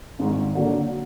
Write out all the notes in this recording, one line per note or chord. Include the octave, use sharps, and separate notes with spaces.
G#1 G#2 D#3
D3 F#3 A#3 D4